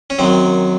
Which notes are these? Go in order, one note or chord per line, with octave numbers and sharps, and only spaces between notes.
C#4
F#2 D#3 F#3 C4